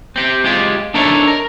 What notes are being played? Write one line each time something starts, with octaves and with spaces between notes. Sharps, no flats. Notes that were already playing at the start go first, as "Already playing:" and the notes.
C4 G4
G#3 F4 G4
D4 D#4 A4 A#4 C#5 E5
A#4